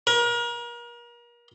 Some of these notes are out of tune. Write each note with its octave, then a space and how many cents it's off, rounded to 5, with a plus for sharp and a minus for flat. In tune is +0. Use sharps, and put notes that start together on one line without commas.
A#4 +35